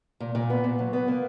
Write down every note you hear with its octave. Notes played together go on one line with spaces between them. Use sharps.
A#2
A#2
B3
A#2
F#3
B3
A#3